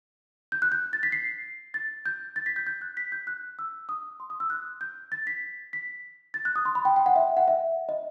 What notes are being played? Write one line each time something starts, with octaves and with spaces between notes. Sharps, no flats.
G6
F#6
G6
A6
B6
C7
A6
G6
A6
B6
G6
G6
F#6
B6
G6
F#6
E6
D#6
C6
D#6
E6
F#6
G6
A6
B6
B6
A6
F#6
D#6
C6
B5
G5
G5
F#5
E5
F#5
E5
D#5